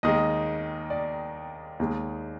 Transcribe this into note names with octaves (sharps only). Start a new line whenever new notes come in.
D#2 D#3 G#3 D#5
D5
D#2 D#3 G#3